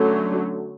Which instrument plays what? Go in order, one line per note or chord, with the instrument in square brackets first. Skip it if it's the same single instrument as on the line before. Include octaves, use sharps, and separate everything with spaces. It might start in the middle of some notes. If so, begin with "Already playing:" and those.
Already playing: [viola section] D3 F#3 A3 C#4